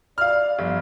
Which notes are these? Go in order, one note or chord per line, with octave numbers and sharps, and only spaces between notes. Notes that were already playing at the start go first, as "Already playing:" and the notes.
D5 F5 F6
G1 F3